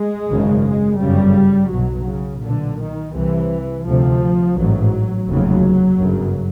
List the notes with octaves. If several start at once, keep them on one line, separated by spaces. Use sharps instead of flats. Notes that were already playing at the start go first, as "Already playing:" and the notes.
Already playing: G#3
G#1 F#2 C#3
G#3
G1 F#2 C#3 G3
B1 B2 F#3
C#3
B1 A#2 D3
D#3
C2 C3 E3
D2 C3 F3
A1 G#2 F#3
F1 D#2 C#3 F#3
G1 F#2 C#3